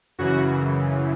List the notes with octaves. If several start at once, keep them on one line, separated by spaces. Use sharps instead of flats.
F#2 C#3 E3 F#4